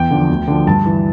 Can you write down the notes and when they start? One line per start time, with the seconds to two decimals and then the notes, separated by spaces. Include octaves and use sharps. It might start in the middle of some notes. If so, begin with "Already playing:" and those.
Already playing: E2 G5
0.11 D3 F3
0.30 D2
0.48 D3 F3
0.67 G2 A5
0.86 E3